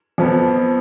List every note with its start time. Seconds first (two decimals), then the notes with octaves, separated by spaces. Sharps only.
0.18 F2 F3 B3